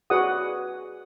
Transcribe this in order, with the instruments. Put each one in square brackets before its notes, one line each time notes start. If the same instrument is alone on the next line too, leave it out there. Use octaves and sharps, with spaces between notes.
[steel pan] F#4 G#4 B4 D5 F#5 D#6